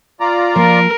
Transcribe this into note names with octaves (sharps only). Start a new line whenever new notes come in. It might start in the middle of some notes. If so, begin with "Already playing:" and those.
F4 D5 A#5
F3 A#3 A#4